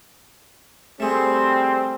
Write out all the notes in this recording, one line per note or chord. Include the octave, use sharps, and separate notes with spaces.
G3 A3 C4 G#4